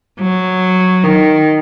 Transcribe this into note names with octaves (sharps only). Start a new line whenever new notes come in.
F#3
D#3